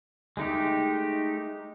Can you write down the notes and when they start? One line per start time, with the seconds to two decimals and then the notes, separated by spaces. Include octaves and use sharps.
0.37 G#3 A3 D#4 G4